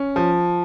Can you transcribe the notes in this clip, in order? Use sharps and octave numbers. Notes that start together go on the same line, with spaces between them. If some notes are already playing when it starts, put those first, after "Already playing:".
Already playing: C#4
F3